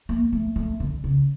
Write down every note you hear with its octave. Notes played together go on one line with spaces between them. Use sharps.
A#3
A3
A3
D3
C#3